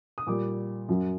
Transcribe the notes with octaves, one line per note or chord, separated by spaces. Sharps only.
D#6
A#2 G3 D6
F#2 F#3